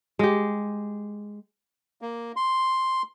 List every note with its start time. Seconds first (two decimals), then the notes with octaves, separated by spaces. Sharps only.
0.19 G#3 G4
2.02 A#3
2.36 C6